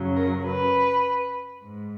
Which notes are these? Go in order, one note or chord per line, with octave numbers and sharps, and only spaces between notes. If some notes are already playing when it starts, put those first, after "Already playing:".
Already playing: F#2 C#3 F#3
A#4
B4
G#2